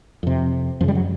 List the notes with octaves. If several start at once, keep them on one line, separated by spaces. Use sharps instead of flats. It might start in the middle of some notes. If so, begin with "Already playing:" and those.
F2 C3
F#2 C#3 F3 G3
F#3